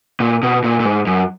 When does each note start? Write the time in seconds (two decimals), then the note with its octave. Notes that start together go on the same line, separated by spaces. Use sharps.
0.20 A#2
0.43 B2
0.64 A#2
0.80 A#2
0.85 G#2
1.07 F#2